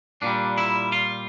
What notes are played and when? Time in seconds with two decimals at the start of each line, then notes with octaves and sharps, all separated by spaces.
0.22 A#2 G3 D4
0.58 E4
0.92 F4